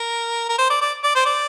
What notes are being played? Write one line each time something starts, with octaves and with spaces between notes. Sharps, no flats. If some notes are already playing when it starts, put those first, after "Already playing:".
Already playing: A#4
A#4
C5
D5
D5
D5
C5
D5